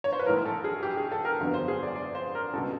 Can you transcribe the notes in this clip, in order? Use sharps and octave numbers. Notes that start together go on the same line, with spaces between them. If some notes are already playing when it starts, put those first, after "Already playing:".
C#5
C5
B4
B1 A2 E3 A#4
A4
G#4
G4
G#4
A4
A#4
G1 F2 D3 F#3 B3
C5
G#4
D5
D5
C5
A#4
C#2 B2 G3 A4